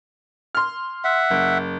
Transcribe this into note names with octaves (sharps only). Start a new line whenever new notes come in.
C6 F6
E5 F#5
F#1